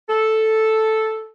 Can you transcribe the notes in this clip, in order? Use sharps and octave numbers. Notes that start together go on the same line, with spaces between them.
A4